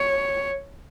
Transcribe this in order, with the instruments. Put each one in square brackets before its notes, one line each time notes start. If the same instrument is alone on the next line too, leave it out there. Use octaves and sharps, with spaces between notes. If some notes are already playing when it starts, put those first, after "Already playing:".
Already playing: [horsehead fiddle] C#5